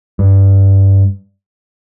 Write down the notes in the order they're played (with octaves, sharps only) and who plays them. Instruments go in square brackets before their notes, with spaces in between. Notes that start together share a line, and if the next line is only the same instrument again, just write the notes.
[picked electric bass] G2